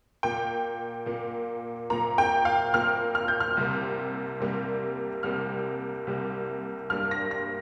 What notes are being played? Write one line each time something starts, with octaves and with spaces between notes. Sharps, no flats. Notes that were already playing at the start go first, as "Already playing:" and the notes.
A#2 A#3 G5
A#2 A#3
A#2 A#3 A#5
G5
F5
A#2 A#3 F6
F6
G6
F6
C2 C3 G3 A#3
C2 C3 G3 A#3
C2 C3 G3 A#3 F6
C2 C3 G3 A#3
G2 G3 A#3 F6
A#6
A#6